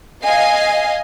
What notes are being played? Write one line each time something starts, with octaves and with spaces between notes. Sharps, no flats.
D#5 F5 G#5 C7